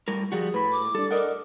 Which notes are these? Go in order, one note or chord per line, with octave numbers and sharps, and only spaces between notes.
A2 G3 A#4
F3 G3 F#4 G#4
A2 B4 B5
D6
G3 D4 A4
A#4 D5 D#5 F#5